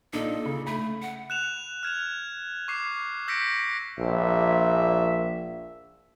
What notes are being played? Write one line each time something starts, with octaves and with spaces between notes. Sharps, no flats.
A#2 D4 D#4 A4
C#3
A3 B5
F#5
F#6 E7 F7
F6 G#6 E7 F7
C#6 D6 C7
E6 G6 A#6 B6 C#7 D7
A#1 E5